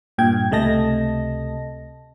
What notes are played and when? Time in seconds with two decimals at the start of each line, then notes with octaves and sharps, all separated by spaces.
0.18 G2 A#2 G5 G#6
0.51 C#2 C3 A3 D#5 A5 A#6